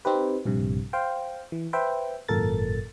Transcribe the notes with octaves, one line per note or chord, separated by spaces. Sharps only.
C4 D#4 G4 B4
A#1 G2 C3
C5 F5 G5
E3
B4 C5 E5 G5
G#1 F#2 A#2 A4 A#4 A6